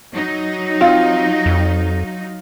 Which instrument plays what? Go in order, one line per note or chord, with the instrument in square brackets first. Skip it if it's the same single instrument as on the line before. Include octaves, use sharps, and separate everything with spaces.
[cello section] F#3 D#4
[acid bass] C4 [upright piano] F4
[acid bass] F2